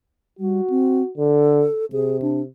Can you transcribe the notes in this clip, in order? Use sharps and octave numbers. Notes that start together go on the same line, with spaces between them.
G3 F#4
C4
D3 A4
C3 G#4
D4